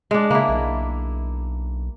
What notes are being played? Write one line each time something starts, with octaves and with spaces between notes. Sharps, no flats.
G#3 D4
C#3 A#3 E4
B1